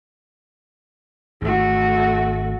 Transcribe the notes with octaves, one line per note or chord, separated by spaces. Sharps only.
G#1 A3 F#4